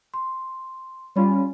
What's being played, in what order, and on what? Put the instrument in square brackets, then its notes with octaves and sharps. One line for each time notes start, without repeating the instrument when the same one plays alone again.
[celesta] C6
[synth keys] G3 C#4 F4 [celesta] C#5 B5